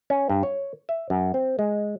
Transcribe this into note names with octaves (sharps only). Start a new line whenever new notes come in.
C#4
G2
C#5
E5
F#2
C4
G#3